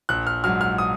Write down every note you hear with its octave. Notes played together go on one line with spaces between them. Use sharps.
A#1 F#6
F6
G#2 F#3 F6
F6
D#6